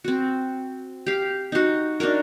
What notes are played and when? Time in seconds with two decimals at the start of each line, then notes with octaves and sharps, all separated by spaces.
0.04 C4 F#4
1.06 G4 F5
1.52 D#4 F#4
2.00 D4 D#4 F#4 A#4